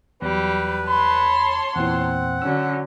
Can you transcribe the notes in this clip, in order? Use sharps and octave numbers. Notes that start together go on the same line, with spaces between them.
E2 F#3 G3 B4
C#5 A5 B5 C6
E2 A#2 E3 C4 F#5
D3 F#3 C#4 E6